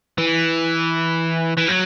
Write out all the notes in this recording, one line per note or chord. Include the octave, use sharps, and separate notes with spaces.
E3
E3
F#3